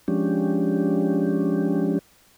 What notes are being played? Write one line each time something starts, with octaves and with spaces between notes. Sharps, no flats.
F3 G#3 C#4 D4 G4